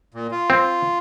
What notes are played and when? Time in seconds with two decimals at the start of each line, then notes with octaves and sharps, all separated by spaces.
0.14 A#2
0.31 F4
0.50 C4